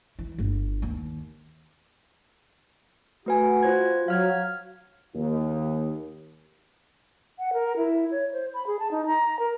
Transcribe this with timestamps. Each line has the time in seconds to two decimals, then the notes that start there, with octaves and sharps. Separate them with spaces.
0.19 E3
0.38 G1
0.82 D#2
3.26 A3 F#4 B4 G#5
3.63 F4 C5 G#6
4.08 F#3 F5 F6 G#6
5.14 D#2
7.37 F#5
7.53 A#4
7.77 E4
8.11 C#5
8.33 C5
8.54 B5
8.67 G#4
8.79 A5
8.91 D#4
9.06 A#5
9.39 A#4